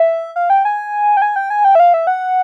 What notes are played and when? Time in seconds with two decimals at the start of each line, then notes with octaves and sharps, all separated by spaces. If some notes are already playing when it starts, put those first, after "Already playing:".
Already playing: E5
0.36 F5
0.50 G5
0.65 G#5
1.17 G5
1.22 G#5
1.36 G5
1.50 G#5
1.65 G5
1.75 E5
1.80 F5
1.94 E5
2.07 F#5